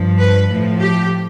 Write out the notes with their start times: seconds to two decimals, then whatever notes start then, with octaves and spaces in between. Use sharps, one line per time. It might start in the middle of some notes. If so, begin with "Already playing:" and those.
Already playing: G2 F3
0.19 B4
0.49 A2 F3
0.79 G4